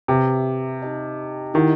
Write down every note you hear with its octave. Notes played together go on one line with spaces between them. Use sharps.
C3 G4 B4 E5
D#4 G4 D#5 A5
D#3 E4 G4 D#5 F#5